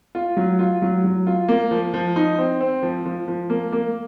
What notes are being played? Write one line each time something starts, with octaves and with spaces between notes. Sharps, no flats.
F4
F#3
F4
F#3
F#3
F4
A#3
F3
F3
D#4
C4
C4
F3
F3
F3
A#3
A#3